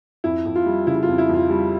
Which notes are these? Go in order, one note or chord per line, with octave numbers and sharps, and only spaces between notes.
F2 E4
F2
F4
G3
C#3 E4
F4
F2
E4
F2
F4
G3